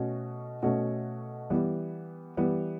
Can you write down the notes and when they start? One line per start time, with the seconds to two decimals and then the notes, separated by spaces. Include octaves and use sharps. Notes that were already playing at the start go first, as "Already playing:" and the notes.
Already playing: B2 A3 C#4 F#4 C#5
0.62 B2 A3 C#4 F#4 C#5
1.50 E3 G3 B3
2.37 E3 G3 B3